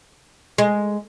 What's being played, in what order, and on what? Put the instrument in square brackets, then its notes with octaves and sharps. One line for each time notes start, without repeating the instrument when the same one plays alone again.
[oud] G#3